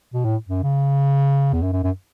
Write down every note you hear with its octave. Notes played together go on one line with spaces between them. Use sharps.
B2
A2
F#2
C#3
E2
F#2
F#2
F#2